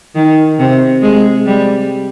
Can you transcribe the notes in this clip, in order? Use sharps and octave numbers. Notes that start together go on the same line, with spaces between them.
D#3
C3
G#3
G3